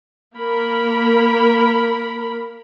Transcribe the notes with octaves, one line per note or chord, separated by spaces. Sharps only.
A#3 A#4 B5